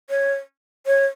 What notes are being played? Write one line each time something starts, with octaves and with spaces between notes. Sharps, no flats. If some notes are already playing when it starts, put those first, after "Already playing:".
C#5
C#5